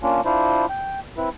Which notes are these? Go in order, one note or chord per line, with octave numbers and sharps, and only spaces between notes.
A#3 C#4 D4 F4
D4 E4 F4 C5
G5
C4 E4 B4